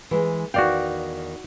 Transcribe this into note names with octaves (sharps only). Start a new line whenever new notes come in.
E3 G#3
E2 D#3 F#4 D5 F5 G5